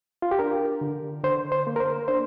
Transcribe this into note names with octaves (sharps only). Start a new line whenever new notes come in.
F4
G4
D4 A#4
D3
D3 C5
C5
A#3
A#4
C5
D4 C5